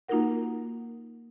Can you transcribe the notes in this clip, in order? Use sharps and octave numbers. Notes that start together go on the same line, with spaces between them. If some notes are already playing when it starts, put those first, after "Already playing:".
A#3 D#4 F4 F#4 A#4 F#5